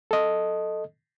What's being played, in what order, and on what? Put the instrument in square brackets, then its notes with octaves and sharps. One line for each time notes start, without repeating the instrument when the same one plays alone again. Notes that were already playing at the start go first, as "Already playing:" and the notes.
[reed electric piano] A4 D#5